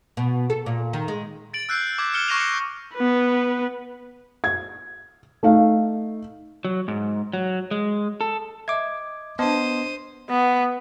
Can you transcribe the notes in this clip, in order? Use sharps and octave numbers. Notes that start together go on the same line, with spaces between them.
B2
A4
A#2
D#3
G#3
A6 D7 F#7
E6 F#6 G6 C7
D6 G#6 E7
F6 C#7 E7 G7
C#6 F#6 A#6 C7 D#7 F7
F#6 C#7
B3 B4
G#6
A3 D#4 F5
F#3
G#2
F#3
G#3
A4
D#5 E5 D6 G#6
B3 D4 C5 D#5 A5 D#7
B3